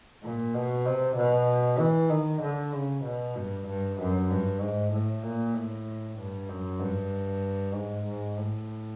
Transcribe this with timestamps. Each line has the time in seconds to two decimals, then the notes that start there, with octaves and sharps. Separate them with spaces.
0.23 A#2
0.54 B2
0.86 C3
1.16 B2
1.79 E3
2.10 D#3
2.41 D3
2.73 C#3
3.04 B2
3.36 G2
3.67 G2
3.99 F#2
4.30 G2
4.61 G#2
4.92 A2
5.23 A#2
5.54 A2
6.18 G2
6.49 F#2
6.80 G2
7.74 G#2
8.06 G#2
8.36 A2